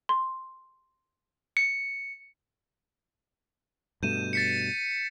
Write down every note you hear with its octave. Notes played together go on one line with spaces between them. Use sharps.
C6
C#7
G2 B2 A3 G6 D#7 E7
A6 B6 C#7